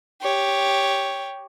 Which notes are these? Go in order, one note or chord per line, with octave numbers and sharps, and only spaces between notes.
G4 C#5